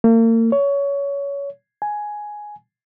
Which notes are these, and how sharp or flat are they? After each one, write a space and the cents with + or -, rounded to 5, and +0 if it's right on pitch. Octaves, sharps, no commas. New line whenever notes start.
A#3 -40
C#5 +20
G#5 +5